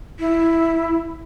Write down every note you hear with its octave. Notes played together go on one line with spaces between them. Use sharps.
E4